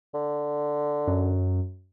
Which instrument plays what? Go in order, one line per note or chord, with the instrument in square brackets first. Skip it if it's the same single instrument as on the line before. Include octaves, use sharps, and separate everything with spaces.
[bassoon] D3
[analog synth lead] F#2